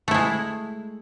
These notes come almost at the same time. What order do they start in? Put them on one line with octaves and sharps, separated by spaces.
A3 E4 G#3